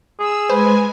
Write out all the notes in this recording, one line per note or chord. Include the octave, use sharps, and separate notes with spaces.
G#4 E6
G#3 B4 C5 G#5